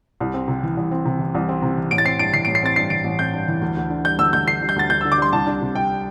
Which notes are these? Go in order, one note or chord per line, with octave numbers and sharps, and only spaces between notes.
C2
C4
C3
E3
C2
C4
C3
E3
C2
C4
C3
E3
A1 D7
A6
C4 C7
G2 D7
E3 C7
D7
A1
C7
C4 A6
G2 C7
E3 D7
A1
C4 G6
G2
E3
D2
D2
D3
G3 G6
D2 E6
D2 G6
D3 C7
G3
G6
D2 A6
D2 G6
E6
D3
D6
G3 C6
C2 A5
D4
C3
G3 G5